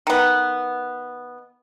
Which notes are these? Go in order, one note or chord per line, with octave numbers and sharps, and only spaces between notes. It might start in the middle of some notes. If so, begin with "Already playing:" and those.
D#3 B3